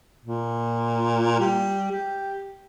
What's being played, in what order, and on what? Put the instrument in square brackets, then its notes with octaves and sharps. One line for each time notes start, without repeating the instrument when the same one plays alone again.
[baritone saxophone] A#2
G3
G4